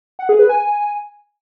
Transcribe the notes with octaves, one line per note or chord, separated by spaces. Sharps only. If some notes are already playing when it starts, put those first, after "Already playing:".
F#5
G#4
B4
G#5